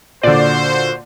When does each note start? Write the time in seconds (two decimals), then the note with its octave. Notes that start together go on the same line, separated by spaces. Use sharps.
0.23 A#2 D3 F#4 C5 D5